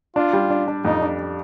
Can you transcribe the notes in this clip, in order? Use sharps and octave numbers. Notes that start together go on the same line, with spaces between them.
D4 F4
G3
D4
D4
F2 D#4
D4